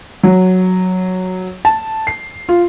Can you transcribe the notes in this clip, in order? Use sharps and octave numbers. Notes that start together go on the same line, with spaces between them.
F#3
A5
C7
F4